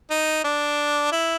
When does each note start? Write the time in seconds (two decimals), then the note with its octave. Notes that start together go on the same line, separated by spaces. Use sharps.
0.10 D#4
0.44 D4
1.12 E4